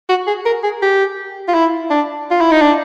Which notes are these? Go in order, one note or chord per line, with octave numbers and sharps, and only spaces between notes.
F#4
G#4
A#4
G#4
G4
F4
E4
D4
F4
E4
D#4
D4